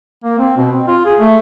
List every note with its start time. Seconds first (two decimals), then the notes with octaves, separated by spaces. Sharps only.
0.24 A#3
0.39 C4
0.57 B2
0.72 C4
0.88 F4
1.05 G#4
1.19 A3